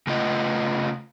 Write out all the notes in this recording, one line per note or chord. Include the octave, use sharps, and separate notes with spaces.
C#3 A3 B3 F4 D#5